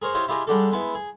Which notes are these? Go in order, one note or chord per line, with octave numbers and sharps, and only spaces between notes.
G#4 A#4 C5 C#5
E4 F4 G4 C5 C#5 D#5
E4 F4 G4 G#4 D#5 E5
G3 G#3 D4 F#4 G4 A4
G#3 B3 E4
G#4